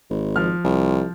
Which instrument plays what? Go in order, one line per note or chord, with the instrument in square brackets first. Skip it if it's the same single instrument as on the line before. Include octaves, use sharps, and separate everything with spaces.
[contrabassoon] G#1
[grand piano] F3 F6
[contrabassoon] C2